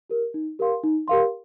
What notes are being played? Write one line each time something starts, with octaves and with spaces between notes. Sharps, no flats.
G4 A#4
D#4
G4 A#4 F5 C6
D#4
G4 A#4 F5 C6